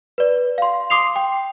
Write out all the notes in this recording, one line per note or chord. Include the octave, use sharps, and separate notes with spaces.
B4 D5
F5 C6
C6 D6 D#6 C7 F7
G5